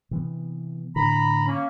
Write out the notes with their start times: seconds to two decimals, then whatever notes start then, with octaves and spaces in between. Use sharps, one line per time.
0.11 C3 E3 B3
0.96 A2 D3 A#5 B5
1.47 A#3 C#4